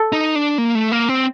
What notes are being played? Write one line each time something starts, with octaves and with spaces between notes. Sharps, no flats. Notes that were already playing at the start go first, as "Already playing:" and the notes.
Already playing: A4
D#4
D4
A#3
A3
A#3
C4